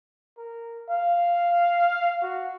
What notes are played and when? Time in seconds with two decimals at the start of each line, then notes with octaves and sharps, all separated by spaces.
0.38 A#4
0.90 F5
2.22 F#4